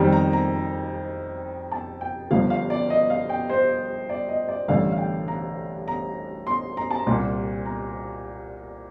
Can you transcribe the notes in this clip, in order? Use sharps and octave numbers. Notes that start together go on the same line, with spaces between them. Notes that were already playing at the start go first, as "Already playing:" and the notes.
Already playing: F2 D#3 G3 A#5
A#5
A#5
A5
G5
G1 G2 F3 F5
F5
D5
D#5
F5
G5
C5
D5
D#5
D5
A1 G2 D3 F5
F5
G5
A#5
A#5
C6
A#5
A5
A#5
C2 A#2 G3 C6
A#5